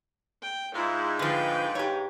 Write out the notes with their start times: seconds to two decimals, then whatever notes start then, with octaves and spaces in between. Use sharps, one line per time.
0.43 G5
0.74 G#2 E4 F4
1.19 D3 F3 B4 F5 G5
1.75 G4 C#5